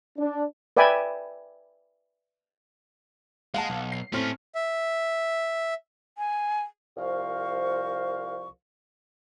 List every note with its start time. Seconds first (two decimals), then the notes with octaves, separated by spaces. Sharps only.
0.18 D4
0.77 B4 D5 E5 G5 G#5 B5
3.54 G#3 F5 F#5 A5
3.70 B1
3.92 C7
4.12 A2 A3 C4 C#4 F6
4.55 E5
6.18 G#5
6.97 C2 F3 A#4 C5 F5 C#6